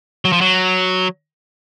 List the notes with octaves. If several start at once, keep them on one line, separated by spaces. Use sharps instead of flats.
F#3
F3
F#3